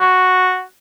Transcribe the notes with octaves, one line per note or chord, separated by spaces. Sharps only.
F#4